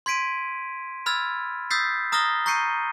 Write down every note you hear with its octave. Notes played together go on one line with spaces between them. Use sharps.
C6 G#6 B6 D7 D#7
B5 E6 F6 G#6 A6
D#6 E6 G6 A6 B6 C7
A#5 D#6 F6 A6 A#6 G7
A#5 C#6 G6 C7 C#7 D#7